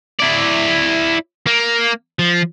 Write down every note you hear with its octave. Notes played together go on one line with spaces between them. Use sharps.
E4 D5
A#3
F3